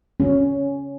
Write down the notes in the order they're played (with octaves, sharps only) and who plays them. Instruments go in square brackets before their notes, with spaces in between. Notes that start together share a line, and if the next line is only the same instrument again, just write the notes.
[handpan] C#4